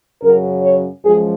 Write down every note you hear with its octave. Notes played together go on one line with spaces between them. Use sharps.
F#2 C#3 F#3 A#4
C#5
F#2 F3 G#3 G#4